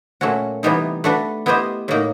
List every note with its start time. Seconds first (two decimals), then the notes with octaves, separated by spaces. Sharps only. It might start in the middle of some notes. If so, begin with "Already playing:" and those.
0.21 A#2 F#3 A3 C#4 F#4
0.63 C3 E3 G3 B3 D#4
1.04 A3 D4 F#4 B4
1.46 B3 E4 G4 C5 D#5
1.88 A2 F#3 A#3 D#4